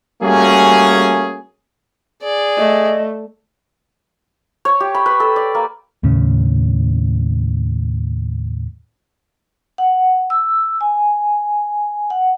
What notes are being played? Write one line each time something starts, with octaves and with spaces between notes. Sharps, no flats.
G3 A3 A#3 C#4 F#4 G#4
G#4 D5
A3 D#5
C#5
G4
B5
B4
A4
D5
A#3
D#2 A2 C#3 C#4
F#5
E6
G#5
F#5